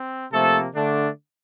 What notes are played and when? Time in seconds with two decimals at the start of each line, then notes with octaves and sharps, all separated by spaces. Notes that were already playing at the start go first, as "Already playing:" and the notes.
Already playing: C4
0.33 C3 F3 A3 A#3 A4
0.75 D3 A3 D4